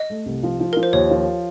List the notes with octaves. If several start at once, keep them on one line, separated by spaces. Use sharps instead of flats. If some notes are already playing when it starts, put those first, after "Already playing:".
Already playing: D#5
A3
C2
F3
F3
F3 A#4
C5
D#2 C#5
F3